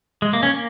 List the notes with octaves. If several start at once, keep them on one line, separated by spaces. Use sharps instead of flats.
G#3
A#3
C#4
A#3